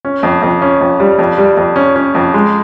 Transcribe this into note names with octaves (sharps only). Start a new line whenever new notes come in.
C#4
F2
F2
C#4
F2
G3
F2
G3
F2
C#4
C#4
F2
G#3